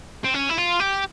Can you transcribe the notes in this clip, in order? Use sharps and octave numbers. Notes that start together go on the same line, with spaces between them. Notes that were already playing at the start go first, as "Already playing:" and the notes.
C4
C#4
E4
F4
G4